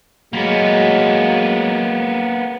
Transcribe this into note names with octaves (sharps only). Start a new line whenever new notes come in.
F#3 G#3 A#3 B3